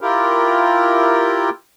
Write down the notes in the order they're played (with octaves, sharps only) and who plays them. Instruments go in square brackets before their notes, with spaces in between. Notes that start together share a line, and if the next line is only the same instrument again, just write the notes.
[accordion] E4 F4 G4 A#4